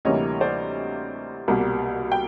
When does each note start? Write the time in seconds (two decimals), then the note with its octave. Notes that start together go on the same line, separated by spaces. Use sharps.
0.05 D2 C3 E3 G3 A#3 C#5 D#5
0.41 C5 D5
1.48 C2 B2 G3 A#3
2.12 G5